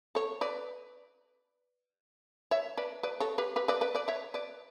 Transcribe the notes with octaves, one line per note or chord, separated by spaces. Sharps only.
A4 C#5
B4 D5
C#5 E5
B4 D5
B4 D5
A4 C#5
G4 B4
G4 B4
B4 D5
B4 D5
B4 D5
C#5 E5
B4 D5